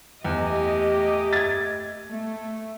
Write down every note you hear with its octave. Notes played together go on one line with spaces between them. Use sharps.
E2 A3 G4 D#5
G#6 A6
A3